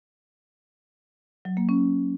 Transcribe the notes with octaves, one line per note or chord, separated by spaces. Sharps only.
F#3
A#3
C#4